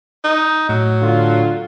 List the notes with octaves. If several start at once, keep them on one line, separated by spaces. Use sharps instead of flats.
D#4
A2 F#3
D3 F4